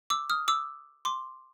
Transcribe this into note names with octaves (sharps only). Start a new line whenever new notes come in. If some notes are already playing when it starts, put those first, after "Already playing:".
D6 E6
D#6 F6
D6 E6
C6 D6